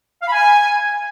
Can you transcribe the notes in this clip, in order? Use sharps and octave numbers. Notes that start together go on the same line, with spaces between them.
F5
B5
G#5